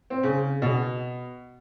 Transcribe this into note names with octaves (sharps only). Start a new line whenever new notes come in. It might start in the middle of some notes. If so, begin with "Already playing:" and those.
C4
C#3
B2